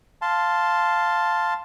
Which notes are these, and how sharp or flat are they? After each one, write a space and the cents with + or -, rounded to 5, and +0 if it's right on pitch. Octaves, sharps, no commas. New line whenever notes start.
F5 +0 A5 +0 C6 -5